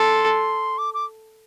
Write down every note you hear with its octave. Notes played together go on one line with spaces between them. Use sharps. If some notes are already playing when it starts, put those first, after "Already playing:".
Already playing: A4 C6
D6
D6